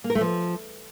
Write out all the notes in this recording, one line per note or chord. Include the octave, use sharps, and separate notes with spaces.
A#3
A#4
A3
F3